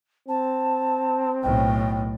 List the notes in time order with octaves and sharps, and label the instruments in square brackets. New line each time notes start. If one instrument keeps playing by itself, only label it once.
[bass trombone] C4 [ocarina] A5
[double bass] B1 A2 [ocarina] G5